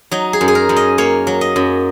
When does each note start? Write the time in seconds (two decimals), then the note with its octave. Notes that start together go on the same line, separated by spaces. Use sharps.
0.11 F#3 D#4
0.33 G#4
0.41 F#2
0.48 G#4
0.55 A#4
0.69 F#2
0.76 D#5
0.98 A#3 C#5
1.27 F#3
1.41 D#5
1.56 F#2